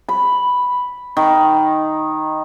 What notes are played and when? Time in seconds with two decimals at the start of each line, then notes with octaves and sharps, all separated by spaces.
0.09 B5
1.17 D#3